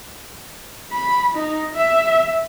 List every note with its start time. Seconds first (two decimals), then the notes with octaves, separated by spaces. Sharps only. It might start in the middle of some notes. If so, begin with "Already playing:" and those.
0.92 B5
1.34 D#4
1.75 E5